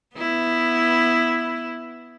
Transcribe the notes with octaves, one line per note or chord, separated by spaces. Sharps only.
B3 E4